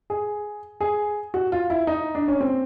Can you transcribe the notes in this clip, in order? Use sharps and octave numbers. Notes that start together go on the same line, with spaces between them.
G#4
G#4
F#4
F4
E4
D#4
D4
C#4
C4